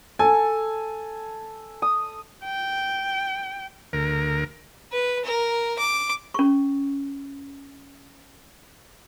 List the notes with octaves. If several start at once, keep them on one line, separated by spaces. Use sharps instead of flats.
A4 G#5
D#6
G5
D2 A#4
B4
A#4
D6
C#4 C#6